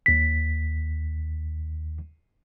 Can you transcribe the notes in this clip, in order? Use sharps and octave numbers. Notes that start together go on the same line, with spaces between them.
D#2 B6